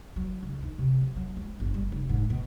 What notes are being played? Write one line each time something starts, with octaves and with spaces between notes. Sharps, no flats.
F#3
C#2
D#3
C3
F3
F#3
G#3
G1
G3
F1
G#2
B2